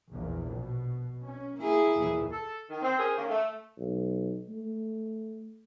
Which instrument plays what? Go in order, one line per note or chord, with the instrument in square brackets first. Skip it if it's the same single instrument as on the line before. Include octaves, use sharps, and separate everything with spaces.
[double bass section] A#1 E2
B2
C#4
[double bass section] A#3 [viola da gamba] E4 G#4
[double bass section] D#2 A#2 E3
[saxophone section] A4
D#3
C4
C#4 G#4 A#4 C5
D#3 A#3 C#4
A3
[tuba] B1
A3